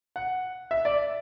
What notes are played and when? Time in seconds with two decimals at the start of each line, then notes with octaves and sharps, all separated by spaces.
0.16 F#5
0.71 E5
0.85 D5